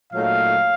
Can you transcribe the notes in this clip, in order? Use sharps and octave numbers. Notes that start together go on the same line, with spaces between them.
A#2 F#3 A3 D#4 F5